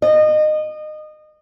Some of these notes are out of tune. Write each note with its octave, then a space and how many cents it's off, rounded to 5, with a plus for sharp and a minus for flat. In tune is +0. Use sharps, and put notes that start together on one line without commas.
D#5 -25